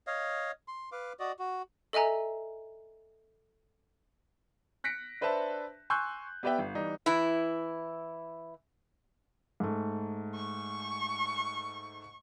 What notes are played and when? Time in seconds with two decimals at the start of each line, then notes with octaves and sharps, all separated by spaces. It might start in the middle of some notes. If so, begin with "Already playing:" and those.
0.07 C#5 D#5 F5
0.68 C6
0.92 B4 F5 D6
1.19 F#4 D5 D#5
1.39 F#4
1.93 A4 D#5 E5 G#5 A#5
4.84 F#6 A#6 B6 C#7 D7
5.21 D4 B4 C5 E5 A5
5.90 G#5 C6 C#6 E6 F#6 G6
6.43 B3 G4 B4 D5 E5 G5
6.59 G1
6.75 E3 G3 D#4
7.06 E3 E4
9.60 G#2 A3
10.35 C#6